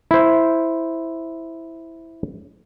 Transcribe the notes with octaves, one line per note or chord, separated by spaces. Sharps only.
E4 C5